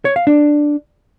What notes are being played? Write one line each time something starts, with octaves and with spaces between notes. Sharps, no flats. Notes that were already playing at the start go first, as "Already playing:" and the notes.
C#5
F5
D4